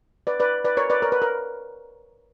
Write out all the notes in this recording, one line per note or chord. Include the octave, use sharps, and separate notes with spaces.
B4 D5
B4 D5
B4 D5
A#4 C#5
B4 D5
A#4 C#5
B4
A#4